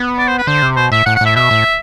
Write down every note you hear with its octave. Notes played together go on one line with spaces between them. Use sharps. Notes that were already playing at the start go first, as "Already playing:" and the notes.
Already playing: B3
D5
C5
B4
D3 C5
C3
B2 C5
A2 E5
A2 F#5
F#5
A2 E5
B2 E5
A2